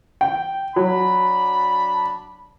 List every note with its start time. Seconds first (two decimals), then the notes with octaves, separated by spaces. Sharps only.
0.21 G5
0.76 F#3 D4 B5